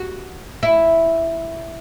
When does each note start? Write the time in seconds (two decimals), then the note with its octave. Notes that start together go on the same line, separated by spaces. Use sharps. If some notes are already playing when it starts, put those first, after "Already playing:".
Already playing: F#4
0.63 E4